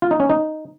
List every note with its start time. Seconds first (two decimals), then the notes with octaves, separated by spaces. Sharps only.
0.02 F4
0.11 D#4
0.20 C#4
0.30 D#4